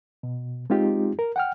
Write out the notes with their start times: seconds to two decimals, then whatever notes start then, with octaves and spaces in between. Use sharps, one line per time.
0.23 B2
0.70 G#3 C4 D#4 F4 G4
1.19 A#4
1.36 F#5 G5 F6